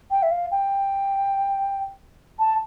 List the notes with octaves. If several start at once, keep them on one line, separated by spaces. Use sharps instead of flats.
G5
E5
F5
G5
A5